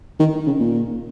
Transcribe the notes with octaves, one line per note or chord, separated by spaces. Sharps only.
D#3
C#3
A#2